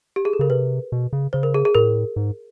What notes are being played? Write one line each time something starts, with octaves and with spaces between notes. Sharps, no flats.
G4
G#4
A4
C#3 A#4
C3 B4
B2
C#3
C#3 C5
A#4
G#4
G#4
A2 A#4
G#2